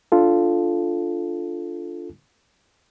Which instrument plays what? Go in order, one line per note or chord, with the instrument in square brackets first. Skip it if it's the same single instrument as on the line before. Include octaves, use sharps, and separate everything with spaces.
[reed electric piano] D4 F4 A4